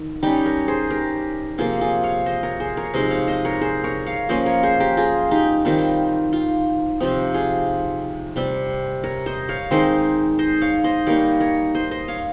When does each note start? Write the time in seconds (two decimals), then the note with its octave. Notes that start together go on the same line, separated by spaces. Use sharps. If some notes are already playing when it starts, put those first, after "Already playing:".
Already playing: D#3
0.23 G3 C#4 D#4 G4
0.46 A#4 C#5
0.68 G#4 C5
0.91 G4 A#4
1.58 C3 F3 A#3 F4 G#4
1.81 F4 G#4
2.03 C#5 F5
2.26 C5 D#5
2.43 A#4 C#5
2.60 G#4 C5
2.77 A#4 C#5
2.94 C3 F3 G#3 D#4 C5 D#5
3.11 C#5 F5
3.28 C5 D#5
3.45 A#4 C#5
3.61 G#4 C5
3.84 A#4 C#5
4.06 C#5 F5
4.29 F3 A#3 C#4 C5 D#5
4.46 A#4 C#5
4.63 G#4 C5
4.80 G4 A#4
4.97 F4 G#4
5.31 D#4 G4
5.65 D#3 G3 C4 D#4 F4
6.33 F4
7.00 C3 F3 C4 D#4
7.34 F4 G#4
8.36 C3 G3 C4
9.04 A#4 C#5
9.26 C5 D#5
9.49 C#5 F5
9.71 D#3 G#3 C4 D#4 C5 D#5
10.39 C5 D#5
10.61 C#5 F5
10.84 C5 D#5
11.07 G3 A#3 D#4 A#4 C#5
11.40 A#4 C#5
11.75 C5 D#5
11.91 C5 D#5
12.08 C#5 F5